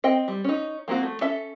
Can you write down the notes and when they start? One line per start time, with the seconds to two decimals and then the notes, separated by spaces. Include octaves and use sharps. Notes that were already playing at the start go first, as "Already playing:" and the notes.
0.04 C4 D#5 G5
0.28 G3
0.44 C#4 D#4
0.88 F3 A#3 C4 F#4
1.03 A3
1.21 C#4 A4 E5